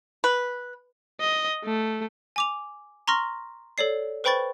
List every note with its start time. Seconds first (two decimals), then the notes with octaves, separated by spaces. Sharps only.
0.24 B4
1.21 D#5
1.64 A3
2.36 G#5 D6 F7
3.08 A#5 C6 C#6 F6 A#6
3.78 A4 C#5 D5 C7
4.24 B4 C5 G5 B5 C#6 A6